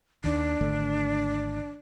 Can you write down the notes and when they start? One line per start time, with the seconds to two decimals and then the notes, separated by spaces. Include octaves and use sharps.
0.24 D#2 D#3 D4
0.61 G#1 D3 A3